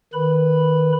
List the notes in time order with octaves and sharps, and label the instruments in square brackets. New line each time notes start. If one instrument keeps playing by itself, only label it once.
[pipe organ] D#3 B4 B5